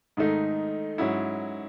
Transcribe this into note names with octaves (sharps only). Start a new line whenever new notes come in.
G#2 D#3 A3 D#4
G#2 F#3 C#4 E4